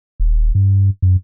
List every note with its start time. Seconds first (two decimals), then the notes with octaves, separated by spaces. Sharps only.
0.20 D#1
0.55 G2
1.02 F#2